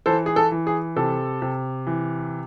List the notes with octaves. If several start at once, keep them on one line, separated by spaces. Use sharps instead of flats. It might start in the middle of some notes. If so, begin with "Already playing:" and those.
E3 A4 C5
G#4
A4
E3
G#4
C3 A4
C3
E3